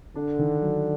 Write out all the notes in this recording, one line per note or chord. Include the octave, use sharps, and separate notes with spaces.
D3 D4
D#3
F#3